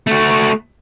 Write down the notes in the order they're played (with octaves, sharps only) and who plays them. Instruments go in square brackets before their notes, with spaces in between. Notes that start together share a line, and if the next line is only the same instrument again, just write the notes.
[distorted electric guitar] A3 F#4